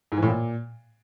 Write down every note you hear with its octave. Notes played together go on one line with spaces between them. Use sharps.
G#2
E3
A2
A#2